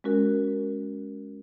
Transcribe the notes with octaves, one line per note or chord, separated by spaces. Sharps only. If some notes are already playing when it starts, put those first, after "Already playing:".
G#3 C#4 F#4 A#4